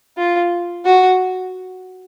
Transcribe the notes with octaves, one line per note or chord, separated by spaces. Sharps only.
F4
F#4